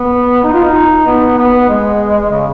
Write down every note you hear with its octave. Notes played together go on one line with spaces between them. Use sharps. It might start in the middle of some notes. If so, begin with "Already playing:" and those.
Already playing: B3
D#4
F4
D#4
B3
B3
G#3
C#3